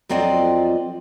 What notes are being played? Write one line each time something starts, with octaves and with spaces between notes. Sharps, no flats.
F2 F#3 C4 F4 D5 D#5